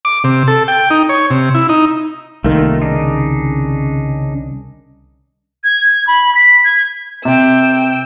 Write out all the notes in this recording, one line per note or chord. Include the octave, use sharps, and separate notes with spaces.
D6
C3
A4
G5
D#4
C#5
C3
E4
D#4
C2 D#3 A3 A#3 F4
C#3 D4 D#4
G#6
B5
B6
G#6
C3 G5 E6